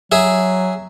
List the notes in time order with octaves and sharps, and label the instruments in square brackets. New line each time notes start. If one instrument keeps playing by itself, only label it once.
[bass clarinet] F#3 [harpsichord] G#4 E5